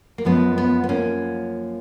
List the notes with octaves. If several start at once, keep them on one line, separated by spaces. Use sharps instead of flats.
A#3
F#2 F3 G#3 B3
B3
B3
A#3 C#4